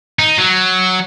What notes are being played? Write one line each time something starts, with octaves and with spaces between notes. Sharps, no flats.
D#4
F#3